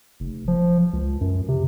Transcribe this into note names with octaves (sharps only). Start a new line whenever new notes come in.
F1
F3
C#2
F#2
C3